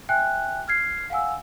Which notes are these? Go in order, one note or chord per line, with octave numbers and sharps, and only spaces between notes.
E5 G5 G#5 F#6
F6 G#6 C7
F5 F#5 G#5 E6